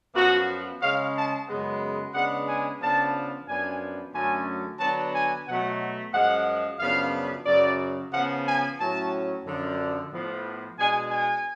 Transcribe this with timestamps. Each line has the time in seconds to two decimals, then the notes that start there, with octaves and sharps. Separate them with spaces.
0.15 F#2 F3 B3 F#4
0.82 C#3 G#3 C#4 F5
1.15 A5
1.48 F#2 C#3 G#3 B3
2.14 C#3 G#3 B3 D4 F#5
2.48 G#5
2.81 C#3 F3 B3 D4 A5
3.47 F#2 F3 B3 D4 G#5
4.13 F#2 D3 F#3 A3 C#4 G#5
4.80 D3 F#3 B3 D4 A5
5.14 G#5
5.46 B2 F#3 A3 F#5
6.13 F#2 F3 G#3 F#5
6.79 F#2 C#3 F3 B3 D4 F5
7.46 F#2 C#3 F#3 D5
8.12 C#3 F3 B3 F#5
8.46 G#5
8.78 A2 F#3 C#4 A5
9.45 F#2 D3 F3
10.12 A2 F3 B3
10.78 B2 G#3 D4 G#5
11.11 G#5